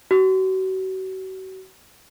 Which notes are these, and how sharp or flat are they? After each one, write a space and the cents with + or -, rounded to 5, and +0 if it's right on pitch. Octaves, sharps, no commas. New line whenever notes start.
F#4 +35